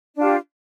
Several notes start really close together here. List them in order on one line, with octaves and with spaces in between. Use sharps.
D4 F4 G4